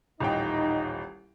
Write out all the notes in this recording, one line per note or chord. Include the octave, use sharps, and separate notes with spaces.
D#1 A1 D#4 D#5 G5